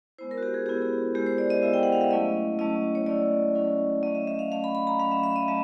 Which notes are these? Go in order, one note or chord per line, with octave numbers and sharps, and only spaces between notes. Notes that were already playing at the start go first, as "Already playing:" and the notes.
G#3 B3 E4 C5
A#4
F#4
G4
G#4
G#3 B3 E4 G4
G4
G#3 B3 E4 G4
C5
D5
D#5
G#3 B3 E4 E5
G5
F#5
F5
E5
F#3 A3 C#4 E4 D#5
F#3 A3 C#4 E4 D#5
C#5
F#3 A3 C#4 E4 D5
F#3 A3 C#4 E4
F#3 A3 C#4 D#5
E5
E5
F5
F#3 A3 C#4 F5
B5
B5
A#5
F#3 A3 C#4 F5
E5
E5
D#5
F#3 A3 E5